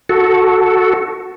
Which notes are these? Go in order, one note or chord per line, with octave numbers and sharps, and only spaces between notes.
F#4 A4